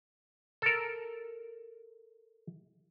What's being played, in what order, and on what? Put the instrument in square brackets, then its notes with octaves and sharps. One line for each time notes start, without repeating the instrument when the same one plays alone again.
[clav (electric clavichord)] A4 A#4